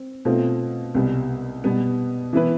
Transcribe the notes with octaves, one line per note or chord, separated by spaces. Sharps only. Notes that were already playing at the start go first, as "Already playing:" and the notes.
Already playing: C4
B2 A3 C4 F4
C2 B2 G3 B3
B2 G3 B3
E3 B3 E4 B4